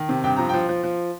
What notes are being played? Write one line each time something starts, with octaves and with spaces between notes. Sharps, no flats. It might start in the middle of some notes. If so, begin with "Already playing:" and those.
Already playing: D#3
C3
G2 G5
F3 A#5
F3 G5
F3
F3